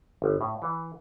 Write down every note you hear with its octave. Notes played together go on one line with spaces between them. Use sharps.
G1
A2
E3